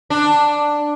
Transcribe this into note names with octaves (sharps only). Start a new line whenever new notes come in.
D4